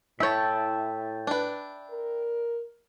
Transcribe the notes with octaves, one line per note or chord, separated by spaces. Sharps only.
A2 E4 C#5 E5 G5 A5
D4 B4
A#4